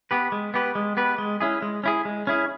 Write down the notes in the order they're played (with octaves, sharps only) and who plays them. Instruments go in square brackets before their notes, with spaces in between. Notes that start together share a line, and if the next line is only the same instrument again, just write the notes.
[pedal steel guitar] B3 G4 B4
G#3
B3 G4 B4
G#3
B3 G4 B4
G#3
C#4 E4 G#4
G#3
C#4 E4 G#4
G#3
C#4 E4 G#4